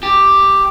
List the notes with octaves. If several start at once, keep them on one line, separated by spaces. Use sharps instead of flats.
G4